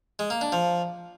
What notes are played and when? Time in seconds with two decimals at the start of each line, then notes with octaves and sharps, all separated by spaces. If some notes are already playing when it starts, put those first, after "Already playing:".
0.19 G#3
0.30 A#3
0.41 D4
0.52 F3